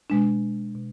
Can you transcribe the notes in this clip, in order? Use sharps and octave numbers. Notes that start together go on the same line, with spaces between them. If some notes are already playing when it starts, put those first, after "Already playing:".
B2 G#3 D4
B2